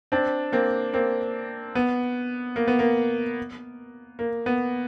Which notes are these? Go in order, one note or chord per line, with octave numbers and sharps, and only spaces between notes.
C4 D4
A#3 C4
A#3 C4
B3
A#3
B3
A#3
A#3
B3